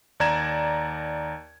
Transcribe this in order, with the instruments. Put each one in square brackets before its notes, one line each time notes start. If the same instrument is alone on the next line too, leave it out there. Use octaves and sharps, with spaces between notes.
[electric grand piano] D#2 D5 A#5 G#6 E7